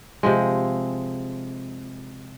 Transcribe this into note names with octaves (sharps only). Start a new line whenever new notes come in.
C3 F3 G#3